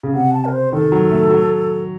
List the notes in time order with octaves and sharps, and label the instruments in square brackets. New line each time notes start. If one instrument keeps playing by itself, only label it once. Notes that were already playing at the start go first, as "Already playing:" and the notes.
[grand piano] C#3
[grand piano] C3 [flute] F#5
[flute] A5
A#4
C5
[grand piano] D#3 [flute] A4
[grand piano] F#3
A3
F#3